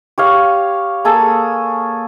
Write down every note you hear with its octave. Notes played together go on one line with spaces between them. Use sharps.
G4 C#5 F5
A#3 G#4 A4